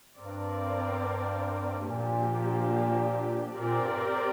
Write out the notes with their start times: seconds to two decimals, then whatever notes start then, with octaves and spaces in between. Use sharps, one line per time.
0.17 G2 C4 A#4 D5
1.76 G2
1.88 A#2 F3 A#3 D4 G4
3.59 A#2 C4 G4 A#4 D5
3.80 G2